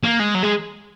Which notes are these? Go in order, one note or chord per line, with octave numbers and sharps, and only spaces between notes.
A#3
G#3
F#3
G#3